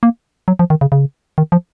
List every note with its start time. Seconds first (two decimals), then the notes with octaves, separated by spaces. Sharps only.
0.03 A#3
0.48 F#3
0.59 F3
0.70 D#3
0.81 C#3
0.92 C#3
1.38 D#3
1.52 F3